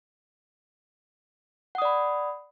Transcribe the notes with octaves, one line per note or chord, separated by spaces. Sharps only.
D5 F#5 B5 D#6